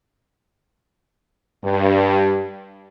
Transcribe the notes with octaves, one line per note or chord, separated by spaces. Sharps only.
G2